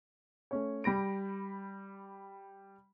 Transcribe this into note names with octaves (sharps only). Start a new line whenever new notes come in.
A3 C#4 C#5
G3 B5 A#6 D7